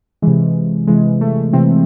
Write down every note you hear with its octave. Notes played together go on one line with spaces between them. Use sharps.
C3 E3 G#3
C3 E3 G#3
A3
C3 E3 C4